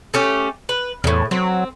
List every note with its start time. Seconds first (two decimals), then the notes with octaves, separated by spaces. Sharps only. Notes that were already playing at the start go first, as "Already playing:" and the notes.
0.14 A3 C#4 G4
0.69 B4
1.04 E2 A2 C#3
1.31 F#3 C4